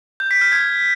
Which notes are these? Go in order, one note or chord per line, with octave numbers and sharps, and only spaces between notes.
G6
B6
F6
G#6